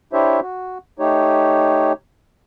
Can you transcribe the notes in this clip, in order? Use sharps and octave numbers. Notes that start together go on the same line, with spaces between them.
D4 E4 G4 C5 C#5 E5
F#4
A3 D#4 G4 C#5